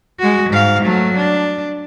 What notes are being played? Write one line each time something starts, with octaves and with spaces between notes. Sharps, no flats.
G#3 F#4
G#2 F5
F#3 A3
D4